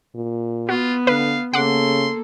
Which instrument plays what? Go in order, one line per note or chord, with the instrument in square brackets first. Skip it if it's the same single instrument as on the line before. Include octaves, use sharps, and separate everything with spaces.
[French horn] A#2
[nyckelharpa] B3 [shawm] F4 [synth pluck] F#4
[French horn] D3 [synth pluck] B4 [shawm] F5
[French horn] C#3 [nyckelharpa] A#3 A4 [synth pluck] F#5 D6 [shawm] C6